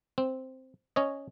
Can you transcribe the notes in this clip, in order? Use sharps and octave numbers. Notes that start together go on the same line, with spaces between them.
C4
C#4 C#5 D#5